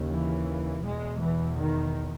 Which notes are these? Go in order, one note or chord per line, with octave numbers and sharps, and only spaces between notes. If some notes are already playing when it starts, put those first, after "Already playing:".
Already playing: D#2 C#3
E3
E2 B2 G#3
E3
D#3